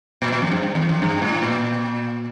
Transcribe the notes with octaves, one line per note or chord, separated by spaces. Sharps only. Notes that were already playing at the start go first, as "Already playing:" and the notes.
A#2
A#2
F2
G2
G2
E2
F2
G2
A2
A#2